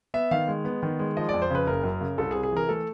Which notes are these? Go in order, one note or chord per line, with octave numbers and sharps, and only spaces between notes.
B3 E5
D#3 F5
G#3
B3
D#3
G#3
F3 D#5
D5
F2
C5
C#3 B4
F#1 A#4
F#2
C#3
C2 A4
G#4
C3
G#4
E3 A#4
A3 A4